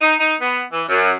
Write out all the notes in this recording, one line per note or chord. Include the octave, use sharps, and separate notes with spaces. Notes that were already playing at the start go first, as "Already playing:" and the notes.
D#4
D#4
B3
E3
F#2